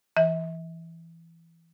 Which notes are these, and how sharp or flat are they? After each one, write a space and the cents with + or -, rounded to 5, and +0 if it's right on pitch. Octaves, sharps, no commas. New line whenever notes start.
E3 +10 E5 -40